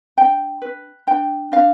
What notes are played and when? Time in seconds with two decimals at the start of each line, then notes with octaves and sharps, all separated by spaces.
0.17 D4 G5
0.62 B4
1.07 D4 G5
1.52 D4 F5